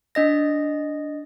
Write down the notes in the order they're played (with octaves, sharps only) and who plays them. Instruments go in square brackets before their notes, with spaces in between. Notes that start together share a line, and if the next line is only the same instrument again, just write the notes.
[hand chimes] D4 D#5 A#6